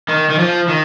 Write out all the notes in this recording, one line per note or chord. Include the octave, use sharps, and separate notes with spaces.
D#3
D#3
F3
D#3